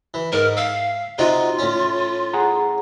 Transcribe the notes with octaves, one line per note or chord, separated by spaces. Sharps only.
E3
G#2 A#4
E5 F5
C3 D#4 F4 F#4
A2 C#4
G#4 F#5 A#5